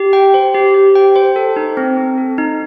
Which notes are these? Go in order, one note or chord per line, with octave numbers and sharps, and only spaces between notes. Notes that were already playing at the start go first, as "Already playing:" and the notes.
Already playing: G4
G5
C5
G4
G4
G5
C5
A4
D#4
C4
C4
A4
D#4